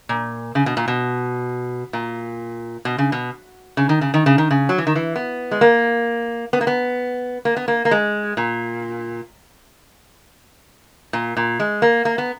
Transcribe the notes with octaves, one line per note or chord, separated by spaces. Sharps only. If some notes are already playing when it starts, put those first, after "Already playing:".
A#2
C#3
B2
A#2
B2
A#2
B2
C#3
B2
C#3
D#3
C#3
D#3
C#3
D#3
C#3
F#3
E3
D#3
E3
B3
G#3
A#3
B3
A#3
B3
A#3
B3
A#3
A#3
G#3
A#2
A#2
A#2
G#3
A#3
A#3
B3